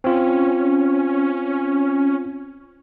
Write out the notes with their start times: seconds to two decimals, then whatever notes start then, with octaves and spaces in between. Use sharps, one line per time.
0.04 C4 C#4 F4